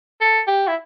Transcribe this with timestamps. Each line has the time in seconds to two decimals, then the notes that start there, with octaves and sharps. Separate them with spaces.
0.21 A4
0.47 G4
0.67 E4